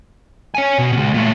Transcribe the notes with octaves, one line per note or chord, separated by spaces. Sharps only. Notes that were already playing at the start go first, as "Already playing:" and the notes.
C#5 G#5
B2
C#2 B2
A#2 A3